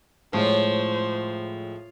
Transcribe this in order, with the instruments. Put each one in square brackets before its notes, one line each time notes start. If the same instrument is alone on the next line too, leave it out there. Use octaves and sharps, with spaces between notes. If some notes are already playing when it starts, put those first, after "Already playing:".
[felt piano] A2 G#3 [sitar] F3 [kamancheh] C5 [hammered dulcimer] C#5